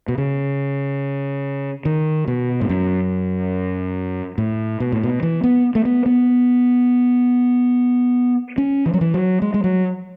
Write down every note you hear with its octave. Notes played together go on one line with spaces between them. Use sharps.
B2
C#3
D#3
B2
G#2
F#2
A2
B2
A2
B2
E3
B3
A3
B3
B3
C#4
E3
F#3
E3
F#3
G#3
G#3
F#3